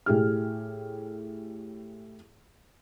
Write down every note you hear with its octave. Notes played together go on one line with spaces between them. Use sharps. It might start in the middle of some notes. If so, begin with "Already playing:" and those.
A2 G4 G#4 F6